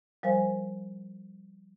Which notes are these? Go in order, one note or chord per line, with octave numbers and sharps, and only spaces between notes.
F3 G3 A#4 C5 F5 G#5